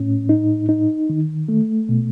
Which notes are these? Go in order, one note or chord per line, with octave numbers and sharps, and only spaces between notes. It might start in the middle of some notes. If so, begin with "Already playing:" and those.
Already playing: A2 C#4
D#4
D#4
D#3
A3
B2